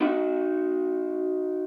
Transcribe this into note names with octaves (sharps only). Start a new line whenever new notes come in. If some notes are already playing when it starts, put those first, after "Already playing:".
D#4 F#4 F#5